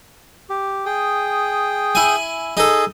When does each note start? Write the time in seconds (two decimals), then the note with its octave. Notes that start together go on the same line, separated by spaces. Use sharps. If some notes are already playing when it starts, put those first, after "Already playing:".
0.50 G4
0.86 G#4 G5 D#6
1.95 E4 G#5
2.57 D#4 G#4 A4